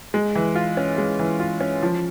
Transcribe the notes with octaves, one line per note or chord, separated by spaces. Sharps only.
G#3
E3
F4
C#4
G#3
E3
F4
C#4
F3